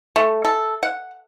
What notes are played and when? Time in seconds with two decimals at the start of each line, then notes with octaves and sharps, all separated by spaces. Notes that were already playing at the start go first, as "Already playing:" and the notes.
0.16 A3
0.45 A4
0.83 F#5